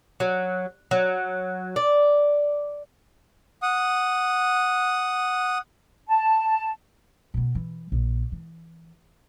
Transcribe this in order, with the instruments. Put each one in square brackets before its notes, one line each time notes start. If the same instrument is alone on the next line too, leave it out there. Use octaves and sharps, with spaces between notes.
[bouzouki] F#3
F#3
D5
[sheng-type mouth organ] F#5 D#6
[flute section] A5
[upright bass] B2 B3
E3
A#1 A#2
E3